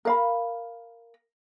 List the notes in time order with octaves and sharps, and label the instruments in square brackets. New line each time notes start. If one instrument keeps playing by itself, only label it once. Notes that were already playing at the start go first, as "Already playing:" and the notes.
[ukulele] A#4 F5 B5